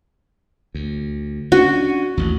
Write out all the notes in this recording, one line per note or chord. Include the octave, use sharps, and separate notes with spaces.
D2
C#4 D4 F#4
A1 D#2